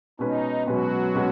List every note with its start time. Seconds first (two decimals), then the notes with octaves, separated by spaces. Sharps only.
0.19 B2 G#3 C#4 D#4 B4
0.67 B2 F#3 G#3 C#4 F#4 B4
1.15 B2 G#3 C#4 B4